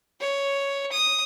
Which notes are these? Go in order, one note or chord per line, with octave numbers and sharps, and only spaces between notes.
C#5
D#6